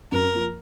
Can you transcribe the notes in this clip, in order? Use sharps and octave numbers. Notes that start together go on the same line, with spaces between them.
F#2 A#4
F3 A#3